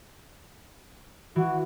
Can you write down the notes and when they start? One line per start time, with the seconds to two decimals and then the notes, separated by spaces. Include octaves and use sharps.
1.36 E3 F#4